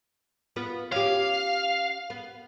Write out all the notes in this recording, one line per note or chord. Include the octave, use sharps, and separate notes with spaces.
B3 F4 B4
C#4 G4 F5
B3